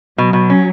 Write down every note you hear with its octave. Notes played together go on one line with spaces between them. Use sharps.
B2 F#3
B2
C#4